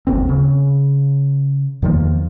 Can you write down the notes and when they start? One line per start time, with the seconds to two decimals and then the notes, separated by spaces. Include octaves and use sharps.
0.07 D1 G1 D#2 C4
0.29 C#3
1.82 E2 D#3 F3 A#3